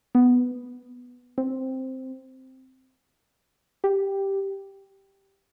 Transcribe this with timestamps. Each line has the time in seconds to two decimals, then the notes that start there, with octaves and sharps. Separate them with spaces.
0.15 B3
1.38 C4
3.84 G4